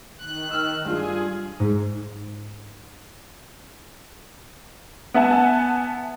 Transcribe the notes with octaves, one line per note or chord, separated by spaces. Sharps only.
D#3 F#6
E6 F6
G2 F4 G#4
G#2
B3 E5 F#5 G#5 A5